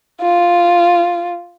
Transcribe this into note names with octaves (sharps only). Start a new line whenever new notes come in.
F4